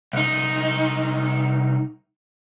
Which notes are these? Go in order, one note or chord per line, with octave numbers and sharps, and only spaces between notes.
C2 D#4